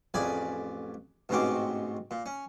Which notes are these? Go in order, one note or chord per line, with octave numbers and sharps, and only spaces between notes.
A1 F2 G#4 D5 G#5 B5
A1 G#2 B2 C4 C#4 D6
A#2
C#4